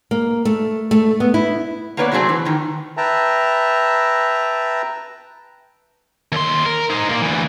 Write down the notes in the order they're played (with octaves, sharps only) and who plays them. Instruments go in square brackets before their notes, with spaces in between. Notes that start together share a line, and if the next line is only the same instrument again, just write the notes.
[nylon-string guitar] A#3
A3
A3
B3
E4
[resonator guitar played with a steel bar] A#3 B3 B4 C#5 D5
C3 F#3 A3 C4 G#4
E3
A2 D#3
[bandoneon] B4 E5 G5 A5 A#5
[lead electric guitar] D#2 C6
A#4
D#4 C5
A#2 A#3
D2 E3